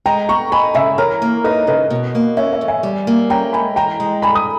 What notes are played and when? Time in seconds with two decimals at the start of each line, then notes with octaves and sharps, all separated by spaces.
0.06 G#3 G5 A#5
0.29 B3 A#5 C#6
0.52 D#4 G#5 B5
0.75 C#3 E5 G#5
0.98 E3 A#4 C#5
1.22 A#3
1.44 D#4 B4 D#5
1.67 C#3 B4 D#5
1.90 B2
2.15 A#3
2.37 C#4 C#5 E5
2.53 C#5 E5
2.61 E2
2.68 E5 G#5
2.83 G3
3.07 A#3
3.30 C#4 G5 A#5
3.53 G#2 G#5 B5
3.76 E3 G5 A#5
4.00 G#3
4.22 G2 G#5 B5
4.35 D#6